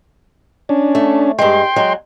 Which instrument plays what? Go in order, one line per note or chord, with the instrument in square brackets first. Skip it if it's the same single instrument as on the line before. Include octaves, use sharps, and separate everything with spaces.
[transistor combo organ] C#4 D4
[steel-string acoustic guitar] A3
[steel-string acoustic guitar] G2 G#3 [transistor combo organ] G5 C6
[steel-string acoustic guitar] F#3 G#3